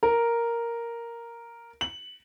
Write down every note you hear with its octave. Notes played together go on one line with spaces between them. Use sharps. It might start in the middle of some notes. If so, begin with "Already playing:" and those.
A#4
F#7